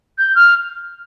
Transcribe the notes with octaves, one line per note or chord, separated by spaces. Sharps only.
G6
F6